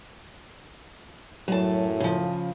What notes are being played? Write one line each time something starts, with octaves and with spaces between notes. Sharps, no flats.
F#2 A2 F#3 A5
C#3 F3